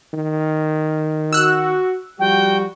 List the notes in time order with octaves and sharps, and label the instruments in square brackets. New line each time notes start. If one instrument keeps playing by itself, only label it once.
[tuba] D#3
[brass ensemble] F#4 [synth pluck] E6 F#6
[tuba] F3 [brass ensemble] G3 F#4 [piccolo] G5